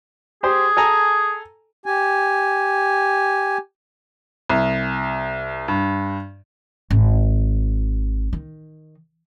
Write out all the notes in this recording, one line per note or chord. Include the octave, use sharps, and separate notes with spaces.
G4 G#4 C5
A4 G#5 A#5
G4 G#5
C2
G2
G#1
D#3